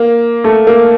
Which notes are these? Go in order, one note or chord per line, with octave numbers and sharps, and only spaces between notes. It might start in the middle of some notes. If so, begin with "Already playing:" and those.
Already playing: A#3
A3
A#3